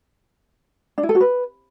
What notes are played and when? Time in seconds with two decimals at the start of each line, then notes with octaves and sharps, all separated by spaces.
0.98 D4
1.03 E4
1.09 A4
1.15 F#4
1.21 B4